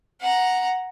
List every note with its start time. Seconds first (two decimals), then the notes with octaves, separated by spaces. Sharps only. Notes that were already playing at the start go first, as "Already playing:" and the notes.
0.21 F#5 A#5